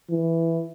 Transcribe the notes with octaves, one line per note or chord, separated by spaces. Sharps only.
E3